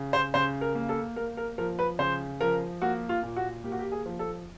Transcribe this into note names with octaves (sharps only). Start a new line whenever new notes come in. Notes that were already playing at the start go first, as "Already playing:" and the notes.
Already playing: C#3
C5
C#3 C5
A#4
A#3
A4
A#3 A#4
A#4
F3 A#4
B4
C#3 C5
F3 A#4
A#3 F#4
F4
A#2
F#4
A#3 G4
F#4
G4
G#4
F3
A4